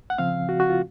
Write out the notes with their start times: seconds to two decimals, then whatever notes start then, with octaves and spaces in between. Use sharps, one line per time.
0.10 F#5
0.18 C#3 F3 C4 F5
0.49 F#4
0.60 F#4
0.70 F4